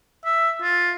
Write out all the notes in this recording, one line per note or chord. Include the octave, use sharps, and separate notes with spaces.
E5
F4